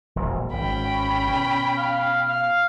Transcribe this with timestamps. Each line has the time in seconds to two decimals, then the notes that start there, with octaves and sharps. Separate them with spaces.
0.16 E1 A#1 E2
0.53 G#1 C#4 G5 B5
1.27 B2
1.78 F5
2.29 F5